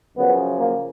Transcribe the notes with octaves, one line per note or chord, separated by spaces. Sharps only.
F#2 C#3 F3 B3
A#3